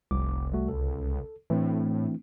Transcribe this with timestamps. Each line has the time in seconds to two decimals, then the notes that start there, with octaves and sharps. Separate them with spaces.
0.11 F1 C2 D6
0.53 G3 A3 F#4
0.68 C#2 A4
1.50 A2 E3 A3 C4 D4